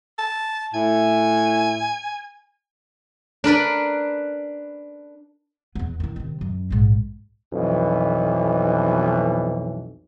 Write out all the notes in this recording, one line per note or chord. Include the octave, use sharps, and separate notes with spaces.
A5
A2 E4 G#5
D4 A#4 B4 D5
E2 B3
D#3 E4
C3 D#3
F#2
A#1 G#2
B1 F2 B2 E3